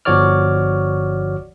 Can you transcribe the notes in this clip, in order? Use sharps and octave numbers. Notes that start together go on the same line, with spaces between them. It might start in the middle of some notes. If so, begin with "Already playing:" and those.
G1 F3 F#4 C#5 D5 F6